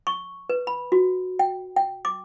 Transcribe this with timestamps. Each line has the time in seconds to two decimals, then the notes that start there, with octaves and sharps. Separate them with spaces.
0.07 C#6
0.49 B4
0.67 B5
0.92 F#4
1.39 G5
1.76 G5
2.05 D6